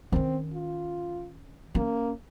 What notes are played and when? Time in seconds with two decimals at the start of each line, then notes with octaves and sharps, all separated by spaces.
0.12 D#3 C4 C#4
0.54 F4
1.75 A#3 C#4